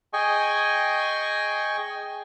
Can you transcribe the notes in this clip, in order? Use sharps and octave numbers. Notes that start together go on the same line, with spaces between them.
G#4 D#5 G5 G#5 C#6